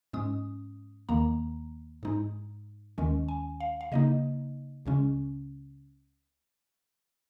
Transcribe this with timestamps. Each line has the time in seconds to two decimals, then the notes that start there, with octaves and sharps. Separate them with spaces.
0.13 G#2 G#3 C#4 D#6
1.09 D#2 D#3 A#3 A#5
2.03 G#2 G#3 D#4
2.98 D#2 D#3 G#3 C#4
3.28 G#5
3.60 F5
3.81 F5
3.92 C#3 A#3 D#4 D#5
4.86 C#2 C#3 G#3 C#4